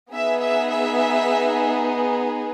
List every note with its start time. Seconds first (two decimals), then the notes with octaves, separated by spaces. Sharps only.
0.12 B3 D#4 G#4 E5
0.41 E5
0.70 E5